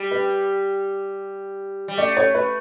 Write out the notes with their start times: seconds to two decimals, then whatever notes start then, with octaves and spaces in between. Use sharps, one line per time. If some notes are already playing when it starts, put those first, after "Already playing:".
Already playing: G3
0.11 B4
1.88 G3
1.98 A3 D5
2.17 C#5
2.34 B4